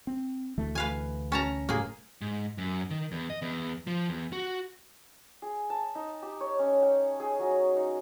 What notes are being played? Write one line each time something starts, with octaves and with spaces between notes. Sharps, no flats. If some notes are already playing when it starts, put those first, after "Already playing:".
C4
D2 E3 A3
B4 F5 G#5
C#4 A5 A#5
F#1 A2 G3 A#3 G#4
G#2
F#2
D#3
E2
D#5
E2
F3
E2
F#4
G#4
A5
D#4
G4
C#5
C#4
G5
G#4
F#3
D#4